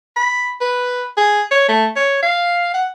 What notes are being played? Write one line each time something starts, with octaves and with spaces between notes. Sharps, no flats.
B5
B4
G#4
C#5
A3
C#5
F5
F#5